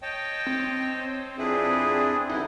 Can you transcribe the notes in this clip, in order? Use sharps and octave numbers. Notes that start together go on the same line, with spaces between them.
C#5 D#5 G5 A5
C4
F2 D4 E4 G#4 B4
G2 D3 D#4 E4